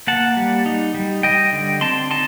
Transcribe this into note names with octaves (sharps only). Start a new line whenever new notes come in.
A#3 F#5 A5
G3
D#4
G3
G3 D#5 G5
D3
C4 A5 C6
D#4 A5 C6